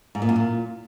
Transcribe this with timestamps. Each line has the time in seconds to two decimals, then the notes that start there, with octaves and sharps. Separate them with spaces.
0.15 G#2
0.22 A#2
0.29 F#2
0.36 A#2